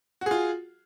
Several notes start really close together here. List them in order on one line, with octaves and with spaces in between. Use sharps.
F#4 G#4 F4